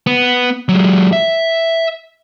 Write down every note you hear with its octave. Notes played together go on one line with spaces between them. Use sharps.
B3
F#3 G#3
E5